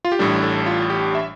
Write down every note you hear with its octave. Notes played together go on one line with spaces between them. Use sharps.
F4
G4
A1 A2 G3 D4 A4
A4
F4
G4
E5